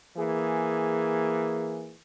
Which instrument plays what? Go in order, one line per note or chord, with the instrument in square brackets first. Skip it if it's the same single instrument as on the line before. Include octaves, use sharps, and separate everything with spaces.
[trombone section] E3 A#3 G#4